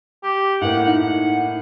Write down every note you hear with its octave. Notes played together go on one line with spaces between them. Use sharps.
G4
A2 A#3 F#5
D#4 F#5